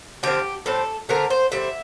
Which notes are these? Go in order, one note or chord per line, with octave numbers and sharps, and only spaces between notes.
D3 F3 C4 G4
A2 G3 C4 A4
D3 A3 C4 A#4
C5
D3 G3 C4 E5